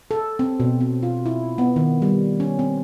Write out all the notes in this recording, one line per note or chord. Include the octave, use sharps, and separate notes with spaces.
A4
C4
B2
C4
F4
E4
B3
D#3
G3
C#4
C4